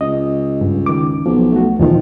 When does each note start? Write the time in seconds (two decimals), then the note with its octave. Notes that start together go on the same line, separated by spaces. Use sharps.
0.01 C#2 D#5
0.61 G2
0.86 D#3 D6
1.26 B1 F3
1.52 A3 F#4
1.79 E2 A#2 D#3 F3